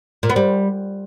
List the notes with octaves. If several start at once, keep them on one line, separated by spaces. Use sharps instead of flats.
A#2
B3
G3